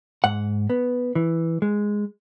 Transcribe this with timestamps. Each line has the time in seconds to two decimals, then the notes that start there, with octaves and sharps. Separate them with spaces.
0.24 G#2 F#5
0.70 B3
1.15 E3
1.62 G#3